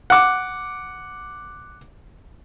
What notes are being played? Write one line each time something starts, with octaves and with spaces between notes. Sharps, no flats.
F#5 D6